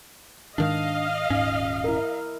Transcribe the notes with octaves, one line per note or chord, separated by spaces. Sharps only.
G#2 D#3 G#3 D4 D#5 F5
D#1 G#2 C#4
E4 A#4